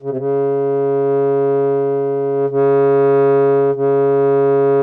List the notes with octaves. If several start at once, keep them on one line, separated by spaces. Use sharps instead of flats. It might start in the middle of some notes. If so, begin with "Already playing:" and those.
C#3
C3
C#3
C#3
C#3